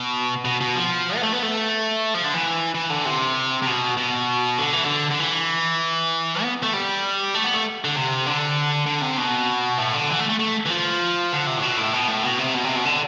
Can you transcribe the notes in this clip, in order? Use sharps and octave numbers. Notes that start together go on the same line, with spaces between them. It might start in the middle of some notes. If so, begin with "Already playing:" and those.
Already playing: B2
B2
B2
F3
B3
A3
B3
A3
F3
D3
E3
E3
D3
C3
C3
B2
B2
D3
E3
D3
D3
E3
B3
A3
G3
A3
B3
A3
D3
C3
D3
D3
C3
B2
A2
D3
E3
A3
A3
A3
E3
F3
D3
C3
A2
B2
A2
B2
A2
B2
C3
B2
C3
B2
D3